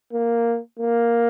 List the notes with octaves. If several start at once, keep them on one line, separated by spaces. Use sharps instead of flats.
A#3
A#3